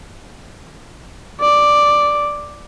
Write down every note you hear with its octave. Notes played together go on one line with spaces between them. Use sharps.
D5